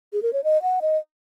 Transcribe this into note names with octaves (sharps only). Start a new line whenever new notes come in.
G#4
A#4
C#5
D#5
F#5
D#5